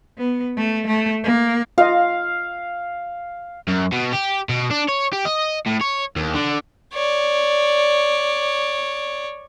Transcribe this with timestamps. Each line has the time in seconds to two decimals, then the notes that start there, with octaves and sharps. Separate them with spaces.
0.17 B3
0.57 A3
0.87 A3
1.23 A#3
1.78 F4 D#5 F5
3.68 F#2
3.92 B2
4.13 G4
4.49 B2
4.71 D4
4.88 C#5
5.13 G4
5.25 D#5
5.66 A2
5.81 C#5
6.16 D#2
6.34 D3
6.94 C#5 D5